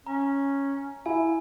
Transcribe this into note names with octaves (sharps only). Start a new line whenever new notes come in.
C#4 A#5
E4 G#5